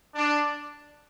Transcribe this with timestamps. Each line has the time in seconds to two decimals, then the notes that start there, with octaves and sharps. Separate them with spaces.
0.14 D4